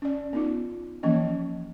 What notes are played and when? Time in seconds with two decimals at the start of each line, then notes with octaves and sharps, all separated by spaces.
0.02 C#4 D5
0.33 B3 D#4 F4
1.03 E3 F3 A#3 C#4 D#5